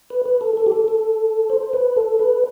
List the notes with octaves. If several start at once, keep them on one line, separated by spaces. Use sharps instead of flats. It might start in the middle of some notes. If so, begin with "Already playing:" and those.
B4
B4
A4
A4
G4
A4
A4
C5
B4
A4
B4